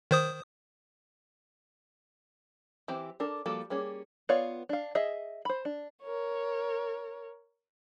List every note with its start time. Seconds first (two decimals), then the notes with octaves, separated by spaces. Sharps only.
0.11 D#3 C5 D#6
2.88 E3 C4 G4 C5
3.20 D4 A4 A#4
3.46 F3 G3 A#3 F#4 A4
3.70 G3 A#3 C#4 G#4
4.29 B3 F4 C#5 D5 F5
4.69 D4 F5
4.95 G#4 D#5 E5
5.45 C5 B5
5.65 D4
6.03 A#4 C#5